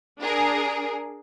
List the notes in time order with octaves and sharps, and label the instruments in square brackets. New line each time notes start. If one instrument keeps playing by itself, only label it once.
[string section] D4 G#4 A#4